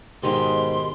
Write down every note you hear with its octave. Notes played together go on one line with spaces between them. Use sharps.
G#2 B2 D#3 G4 C6